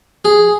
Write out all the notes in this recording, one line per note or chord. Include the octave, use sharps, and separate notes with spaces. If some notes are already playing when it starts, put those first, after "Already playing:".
G#4